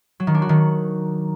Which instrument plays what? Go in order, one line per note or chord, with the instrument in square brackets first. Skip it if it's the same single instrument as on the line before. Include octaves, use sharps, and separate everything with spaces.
[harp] F#3
D#3
D4
F#4
D#3